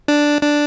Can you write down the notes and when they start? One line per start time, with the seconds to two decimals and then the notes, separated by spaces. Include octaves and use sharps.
0.08 D4
0.42 D4